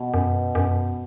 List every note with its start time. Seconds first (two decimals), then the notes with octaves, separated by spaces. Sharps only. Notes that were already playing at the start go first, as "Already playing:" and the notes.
Already playing: B2
0.14 F#2
0.55 F#2